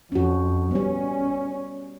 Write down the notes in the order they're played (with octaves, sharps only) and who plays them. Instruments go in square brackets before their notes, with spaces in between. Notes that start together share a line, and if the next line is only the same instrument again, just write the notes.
[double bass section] F2 [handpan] C#4 F#4
[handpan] G3 B3 [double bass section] C#4